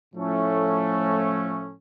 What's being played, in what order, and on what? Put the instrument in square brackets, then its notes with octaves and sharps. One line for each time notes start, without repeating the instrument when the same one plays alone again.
[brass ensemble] A2 F3 A3 C#4